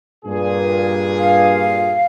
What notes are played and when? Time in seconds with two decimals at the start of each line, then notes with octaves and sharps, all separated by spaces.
0.25 G2 A#2 G#4
1.17 F5